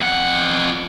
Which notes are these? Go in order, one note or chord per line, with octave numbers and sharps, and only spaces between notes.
F2 F#5